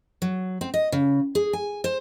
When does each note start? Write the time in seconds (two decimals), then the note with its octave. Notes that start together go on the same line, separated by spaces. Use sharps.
0.22 F#3
0.61 C4
0.74 D#5
0.92 C#3
1.35 G#4
1.53 G#5
1.84 C5